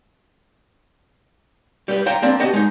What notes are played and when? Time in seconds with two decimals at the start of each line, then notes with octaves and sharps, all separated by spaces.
1.88 G3 B4
2.06 C5 F5 G5 A#5
2.22 A#3 C4 D4
2.40 B3 D4 F#4 G4 D#5
2.53 G#3 D#4